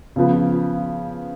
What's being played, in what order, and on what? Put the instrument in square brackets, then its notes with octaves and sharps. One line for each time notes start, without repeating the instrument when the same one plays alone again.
[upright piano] C#3 F3 B3